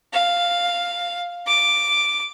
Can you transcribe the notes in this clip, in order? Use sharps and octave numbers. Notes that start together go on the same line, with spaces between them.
F5
D6